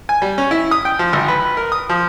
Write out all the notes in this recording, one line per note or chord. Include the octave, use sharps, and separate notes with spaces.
G#5
G3
C#4
E4
D#6
G5
F3
G#1
B4
A#4
D#6
F3